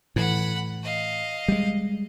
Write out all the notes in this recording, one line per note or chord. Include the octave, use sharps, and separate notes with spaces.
A2 E3 F#5 B5
D#5 F5
G3 G#3